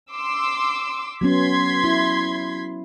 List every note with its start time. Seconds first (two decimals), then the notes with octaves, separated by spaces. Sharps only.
0.12 C6 D6 E6
1.21 F#3 B3 C#4 C6 G#6 B6
1.84 E4